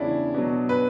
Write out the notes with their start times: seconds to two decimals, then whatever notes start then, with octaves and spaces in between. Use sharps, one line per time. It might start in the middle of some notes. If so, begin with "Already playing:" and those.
Already playing: E2 C#3 G3 C#4 D4 E4
0.34 B2 F#3
0.69 B4